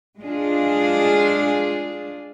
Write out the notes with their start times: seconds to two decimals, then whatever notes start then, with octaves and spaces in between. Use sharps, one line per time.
0.19 G#3 D4 F4 G#4